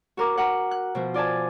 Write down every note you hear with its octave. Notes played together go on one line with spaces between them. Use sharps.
F#4 A#4 D6
A#4 F#5
F#6
B2 F3
F4 D5 G#5 A5